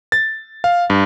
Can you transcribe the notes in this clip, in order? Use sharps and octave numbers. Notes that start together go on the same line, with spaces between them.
A6
F5
G2